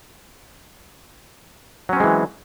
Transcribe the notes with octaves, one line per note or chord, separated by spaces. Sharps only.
E3 F#3 G#3 C4 C#4